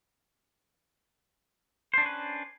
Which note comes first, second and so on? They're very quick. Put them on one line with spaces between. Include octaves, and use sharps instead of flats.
C5 D4 C#4 B4